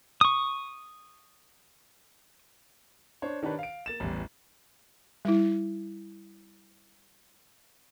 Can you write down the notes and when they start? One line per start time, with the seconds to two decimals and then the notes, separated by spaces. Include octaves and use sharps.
0.21 C#6 D#6
3.22 D4 C5 C#5
3.43 D#3 D4 G4 B4 C#5
3.59 F5 D7
3.86 A#3 A6 E7
4.00 A1 E2 G3
5.25 G3 E4